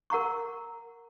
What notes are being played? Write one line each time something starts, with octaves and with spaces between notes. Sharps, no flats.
A#4 F#5 A#5 C#6